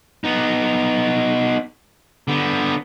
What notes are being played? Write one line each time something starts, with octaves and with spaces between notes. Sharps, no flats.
B3 D#4
D3 B3